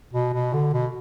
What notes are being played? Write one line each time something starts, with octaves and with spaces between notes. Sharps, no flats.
B2
B2
D3
B2